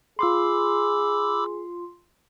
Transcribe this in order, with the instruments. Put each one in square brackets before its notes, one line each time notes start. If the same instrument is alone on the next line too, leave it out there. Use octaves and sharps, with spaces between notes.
[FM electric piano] F4 C6 [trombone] G#4 [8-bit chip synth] B5 D6 E6